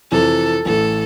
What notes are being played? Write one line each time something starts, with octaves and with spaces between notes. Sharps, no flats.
F2 C3 E3 A4
A1 A2 E3 A4